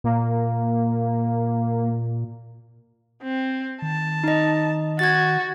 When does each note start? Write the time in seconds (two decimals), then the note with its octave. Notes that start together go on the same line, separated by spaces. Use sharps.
0.04 A#2 A#3
3.23 C4
3.82 D#3 A5
4.24 D#4 D#5
4.99 F#4 G#6 A6